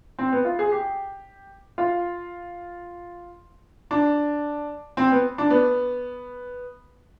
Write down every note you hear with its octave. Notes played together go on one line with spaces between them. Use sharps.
C4
B3
F4
G#4
G4
F4
D4
C4
B3
D4
B3